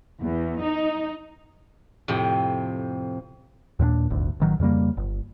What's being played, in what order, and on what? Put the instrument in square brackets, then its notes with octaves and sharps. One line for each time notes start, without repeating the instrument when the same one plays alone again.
[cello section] E2
D#4
[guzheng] F2 A2 C3
[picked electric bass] D#2 A#2 A#3 D4
D#1 G#1 D2
A1 D#3 F#3
F2 C#3 G3 A#3
G1